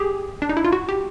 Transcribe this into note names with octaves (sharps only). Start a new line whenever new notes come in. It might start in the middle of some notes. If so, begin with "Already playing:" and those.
Already playing: G4 G#4
D4
D#4
E4
F4
F#4
G4